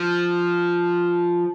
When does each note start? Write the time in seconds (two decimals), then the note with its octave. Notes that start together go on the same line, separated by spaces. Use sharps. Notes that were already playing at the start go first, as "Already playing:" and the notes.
Already playing: F3